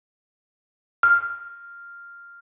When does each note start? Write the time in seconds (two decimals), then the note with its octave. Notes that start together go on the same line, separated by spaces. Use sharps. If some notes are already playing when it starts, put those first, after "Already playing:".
1.03 F6